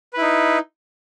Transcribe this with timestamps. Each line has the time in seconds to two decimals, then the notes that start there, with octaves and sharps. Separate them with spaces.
0.13 B4
0.17 E4
0.22 D#4